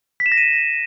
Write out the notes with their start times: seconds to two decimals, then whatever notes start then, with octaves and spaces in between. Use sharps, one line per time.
0.20 B6
0.26 E7
0.32 A#6
0.37 D#7